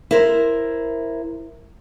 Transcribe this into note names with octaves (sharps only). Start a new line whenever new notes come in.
E4 A#4 C5